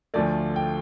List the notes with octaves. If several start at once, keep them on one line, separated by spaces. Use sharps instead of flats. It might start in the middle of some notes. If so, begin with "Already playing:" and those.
D2 D3 F3 A3 D5
G5